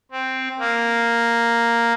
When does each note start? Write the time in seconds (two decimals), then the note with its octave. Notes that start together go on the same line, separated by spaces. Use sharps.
0.12 C4
0.59 A#3